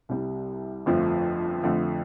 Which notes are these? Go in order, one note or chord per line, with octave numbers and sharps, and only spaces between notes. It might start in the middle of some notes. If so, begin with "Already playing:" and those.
C2 C3 G3
G1 F2 F3 A3
F2 D3 F3 A3